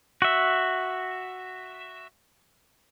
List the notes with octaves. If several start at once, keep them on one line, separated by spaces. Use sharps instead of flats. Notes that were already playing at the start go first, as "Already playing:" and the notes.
F#4 E5